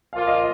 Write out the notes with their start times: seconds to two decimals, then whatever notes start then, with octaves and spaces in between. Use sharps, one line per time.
0.13 A#2 F3 A#3 F4 F5
0.27 D#5